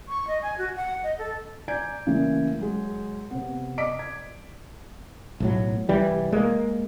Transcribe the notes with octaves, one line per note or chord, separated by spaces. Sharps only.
C#6
D#5
G#5
F#4
F#5
D#5
A4
D5 G#5 A#5 G6 G#6 D7
C#3 E3 A3 A#3 E4
F#3 G#3 G#4
C3 B3
D5 D#5 D6 B6 D7
G#6
B1 A2 F#3
C2 E3 G3
G#3 A#3